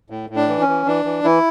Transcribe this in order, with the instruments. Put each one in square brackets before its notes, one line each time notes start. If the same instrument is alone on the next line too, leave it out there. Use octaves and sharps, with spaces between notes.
[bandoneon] A2
A2
D4
E3
C#4
E3
E3 D4
E3
E3 E4